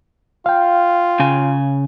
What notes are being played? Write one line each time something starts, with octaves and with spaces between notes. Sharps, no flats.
F4 F5 G5
C#3 G#5